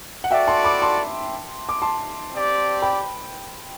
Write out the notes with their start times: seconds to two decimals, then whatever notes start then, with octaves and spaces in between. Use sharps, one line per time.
0.24 F#5
0.31 F#4 A4 D5 E5 G5
0.47 A5 C6
0.64 B5 D6
0.82 A5 C6
1.69 D6
1.82 A5 C6
2.32 C4 G4 D5
2.82 G5 B5